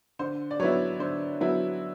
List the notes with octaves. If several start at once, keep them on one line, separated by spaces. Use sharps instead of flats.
D3 C5
D5
F#3 B3 E4 C#5
D3 C5
F#3 B3 E4